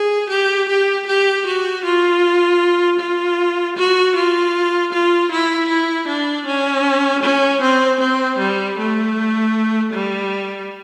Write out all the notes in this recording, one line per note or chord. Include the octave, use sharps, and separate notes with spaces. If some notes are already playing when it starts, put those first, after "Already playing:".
Already playing: G#4
G4
G4
G4
F#4
F4
F4
F#4
F4
F4
E4
E4
D4
C#4
C#4
C4
C4
G3
A3
G3